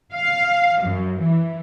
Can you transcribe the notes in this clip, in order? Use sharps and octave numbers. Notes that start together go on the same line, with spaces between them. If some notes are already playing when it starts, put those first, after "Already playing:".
F5
F#2
E3